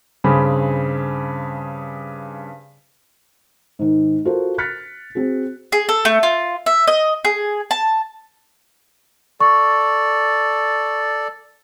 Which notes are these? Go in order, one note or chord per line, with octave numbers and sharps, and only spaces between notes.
G2 C#3 C4 G#4 B5
G#2 D#3
F4 F#4 A4 A#4 C5
F6 F#6 A6 B6 C#7
C4 F#4 G#4
G#4
A4
A3
F4
E5
D#5
G#4
A5
A4 D5 C#6